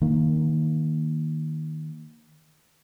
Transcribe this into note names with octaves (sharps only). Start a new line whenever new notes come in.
D#3 A#3